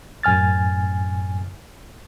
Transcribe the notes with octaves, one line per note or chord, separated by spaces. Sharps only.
F#2 A2 G#5 F6 A6